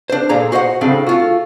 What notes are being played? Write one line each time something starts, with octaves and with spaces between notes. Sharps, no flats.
D4 C5
A#2 G#4 A4 D5 A#5
F#4 C5 D#5 E5 F#5
A2 C#3 C4 D4
A3 F4 F#4